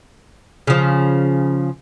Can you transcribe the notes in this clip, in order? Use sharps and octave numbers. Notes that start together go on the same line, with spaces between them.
C#3 F3